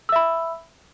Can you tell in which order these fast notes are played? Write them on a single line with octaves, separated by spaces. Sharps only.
E6 E5 B5